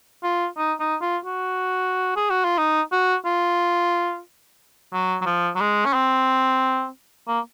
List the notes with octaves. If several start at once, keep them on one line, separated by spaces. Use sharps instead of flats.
F4
D#4
D#4
F4
F#4
G#4
F#4
F4
D#4
F#4
F4
F#3
F#3
F3
F#3
G#3
C#4
C4
A#3